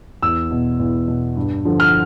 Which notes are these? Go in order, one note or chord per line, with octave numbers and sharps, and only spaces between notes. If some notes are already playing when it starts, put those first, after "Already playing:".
E2 E6
B2
E2
B2
G2
D3 F3
F6